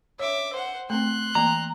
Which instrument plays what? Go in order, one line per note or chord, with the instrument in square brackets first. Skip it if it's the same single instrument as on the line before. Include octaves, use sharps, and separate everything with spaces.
[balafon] C#5 [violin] E5 D6
[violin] C5 F#5
[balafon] A3 C4 [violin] C6 F#6
[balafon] E3 A#3 [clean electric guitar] A#5